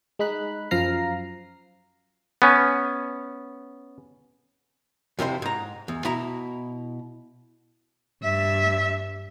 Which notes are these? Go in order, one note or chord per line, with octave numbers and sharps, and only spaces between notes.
G#3 D#4 B5 F#6
F#2 F3 F5 A#5 C7
B3 C#4
F2 C3 E4 C5
G#2 A#5
E2
B2 E4 A#5
G2 E5